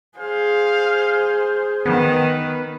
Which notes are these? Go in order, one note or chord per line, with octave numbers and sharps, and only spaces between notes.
G#4 C5 F5
D#3 B3 B4